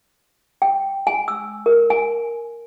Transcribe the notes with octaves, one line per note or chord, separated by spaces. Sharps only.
G5
G#5
E6
A#4
G#5